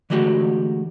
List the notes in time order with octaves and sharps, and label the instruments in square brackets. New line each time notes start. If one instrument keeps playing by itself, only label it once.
[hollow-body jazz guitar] D3 E3 G#3 A3 F#4 G4